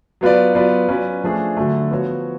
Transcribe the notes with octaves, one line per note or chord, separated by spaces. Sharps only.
F#3 B3 F4 B4 D5
F#3 B3 F4 B4 D5
F#3 C#4 F4 B4 D5
F3 A3 D4 G#4
D3 F#3 A3
F3 B3 F#4 C#5